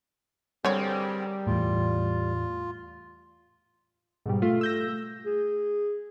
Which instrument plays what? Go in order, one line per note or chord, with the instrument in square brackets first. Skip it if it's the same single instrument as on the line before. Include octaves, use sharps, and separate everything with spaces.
[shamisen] D3 C#5 [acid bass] G3 [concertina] C4 G#4 A#4
[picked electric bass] E2 A2 [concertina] F4
[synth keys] G#2 B2 G3
[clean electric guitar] A3 [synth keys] F4
[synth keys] E6 G6 A#6
[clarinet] G#4